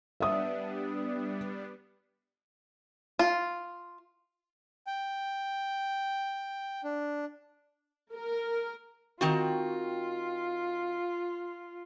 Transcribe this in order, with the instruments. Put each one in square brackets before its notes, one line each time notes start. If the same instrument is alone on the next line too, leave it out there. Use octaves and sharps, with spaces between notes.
[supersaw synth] G3 B3 D4 [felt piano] E5 D#6
[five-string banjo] F4
[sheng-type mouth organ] G5
D4
[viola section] A#4
[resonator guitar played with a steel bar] D#3 C4 F#4 [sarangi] F4